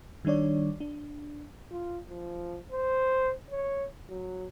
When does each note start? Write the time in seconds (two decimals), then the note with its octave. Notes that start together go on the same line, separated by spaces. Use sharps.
0.25 D#3 G3 D4 C#5 D5
0.80 D4
1.71 F4
2.09 F3
2.72 C5
3.50 C#5
4.10 F#3